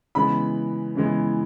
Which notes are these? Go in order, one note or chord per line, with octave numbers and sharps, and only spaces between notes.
C#3 E3 G#3 B3 B5
C#3 E3 G#3 B3